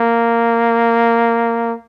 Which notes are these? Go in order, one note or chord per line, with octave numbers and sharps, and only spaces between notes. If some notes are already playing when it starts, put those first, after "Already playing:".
Already playing: A#3